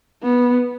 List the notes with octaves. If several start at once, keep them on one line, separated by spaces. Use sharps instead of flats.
B3